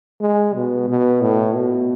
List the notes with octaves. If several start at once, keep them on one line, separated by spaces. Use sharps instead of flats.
G#3
B2
B2
A2
B2